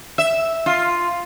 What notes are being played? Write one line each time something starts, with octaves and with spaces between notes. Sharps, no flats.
E5
F4